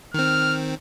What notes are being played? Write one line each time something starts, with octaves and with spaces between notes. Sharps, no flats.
D#3 C4 F6